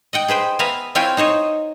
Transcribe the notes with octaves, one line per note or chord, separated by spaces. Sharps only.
D#5 F#5 G5
G#4 B4 C5 G5
B3 E5 F5 G#5 A#5
C4 E4 F4 C#5 G5 G#5
D#4 C5 C#5 D#5